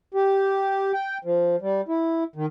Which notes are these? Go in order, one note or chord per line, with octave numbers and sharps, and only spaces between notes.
G4
G5
F3
G3
E4
D#3